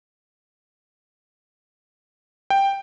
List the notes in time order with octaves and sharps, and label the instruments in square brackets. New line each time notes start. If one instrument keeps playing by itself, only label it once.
[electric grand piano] G5